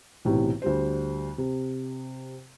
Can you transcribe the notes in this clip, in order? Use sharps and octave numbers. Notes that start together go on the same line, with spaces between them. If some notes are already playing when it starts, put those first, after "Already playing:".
B1 A2 C3 E3
D2 G3 C5
C3